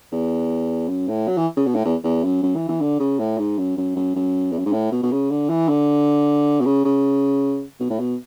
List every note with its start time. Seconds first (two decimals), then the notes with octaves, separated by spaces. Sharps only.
0.12 E2
0.88 F#2
1.08 A2
1.28 F#3
1.37 E3
1.57 C#3
1.66 B2
1.75 A2
1.85 E2
2.04 E2
2.24 F#2
2.42 F#2
2.55 E3
2.68 E3
2.81 D3
3.00 C#3
3.19 A2
3.38 G#2
3.58 F#2
3.77 F#2
3.96 F#2
4.15 F#2
4.52 E2
4.58 F#2
4.66 G#2
4.73 A2
4.92 B2
5.03 B2
5.12 C#3
5.31 D3
5.49 E3
5.69 D3
6.60 B2
6.65 C#3
6.85 C#3
7.80 B2
7.90 A2
8.00 B2